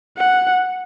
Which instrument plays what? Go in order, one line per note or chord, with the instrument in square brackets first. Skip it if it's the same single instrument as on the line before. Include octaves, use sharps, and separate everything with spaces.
[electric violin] F#5